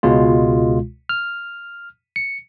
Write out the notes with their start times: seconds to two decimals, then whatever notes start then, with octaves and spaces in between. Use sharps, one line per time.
0.03 C#2 B2 G#3 F4
1.09 F6
2.16 C#7